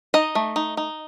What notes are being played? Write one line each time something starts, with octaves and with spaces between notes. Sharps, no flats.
D#4 D#5
A3
D#4
D#4